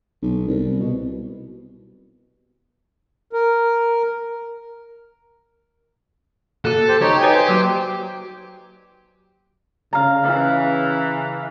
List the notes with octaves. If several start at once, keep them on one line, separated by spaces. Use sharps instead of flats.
B1
C2
B2
A#4
A#3 F#4 A4
G4 C5
D#4 G4 C#5
D#4 F#4 B4 C#5 G#5
C5 G5
F#3 A#3 F#4
C#3 F5 A#5
C#3 E3